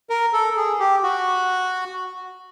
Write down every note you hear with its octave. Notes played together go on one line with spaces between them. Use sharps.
A#4
A4
G#4
G4
F#4